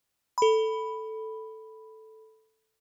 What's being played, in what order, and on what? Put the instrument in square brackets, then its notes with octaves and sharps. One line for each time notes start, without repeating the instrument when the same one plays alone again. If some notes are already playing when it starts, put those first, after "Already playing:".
[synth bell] A4 B5